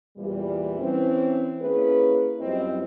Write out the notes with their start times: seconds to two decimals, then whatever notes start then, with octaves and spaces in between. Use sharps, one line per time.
0.17 E2 A#2 E3 G3
0.79 E3 C4 C#4
1.61 A#3 C#4 E4 G#4 B4
2.40 F#2 G3 C4 E4 F4 D#5